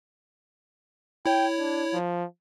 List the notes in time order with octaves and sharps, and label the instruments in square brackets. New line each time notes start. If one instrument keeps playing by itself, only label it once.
[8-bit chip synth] E4 C#5 [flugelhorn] G5
[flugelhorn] D4
F3